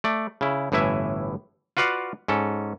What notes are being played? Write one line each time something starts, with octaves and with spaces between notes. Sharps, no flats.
A3 D5
C#3 E4
G1 A2 E3 E4 E5 G#5
F4 F#4 B4 D5 F5 F#5
G#2 C#4 A4